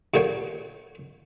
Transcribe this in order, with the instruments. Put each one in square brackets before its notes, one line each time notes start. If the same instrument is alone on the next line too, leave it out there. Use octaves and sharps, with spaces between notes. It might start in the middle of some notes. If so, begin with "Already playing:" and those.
[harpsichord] D#2 A#2 D3 C#5 G5 C#6